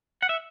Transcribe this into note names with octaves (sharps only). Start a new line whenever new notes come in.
F#5
E5